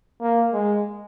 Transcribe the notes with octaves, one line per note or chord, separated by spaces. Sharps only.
A#3
G#3